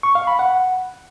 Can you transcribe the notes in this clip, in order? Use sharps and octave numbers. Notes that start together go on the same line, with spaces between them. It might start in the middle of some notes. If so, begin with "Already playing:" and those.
C#6
F5
B5
F#5